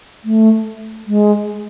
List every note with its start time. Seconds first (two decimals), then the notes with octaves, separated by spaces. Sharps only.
0.24 A3
1.07 G#3